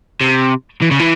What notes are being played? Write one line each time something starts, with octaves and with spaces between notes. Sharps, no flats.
C3
E3
C#3
E3